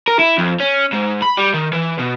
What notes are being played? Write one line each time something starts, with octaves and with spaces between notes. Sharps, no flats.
A#4
E4
F2
C#4
G#2
B5
G3
D#3
E3
B2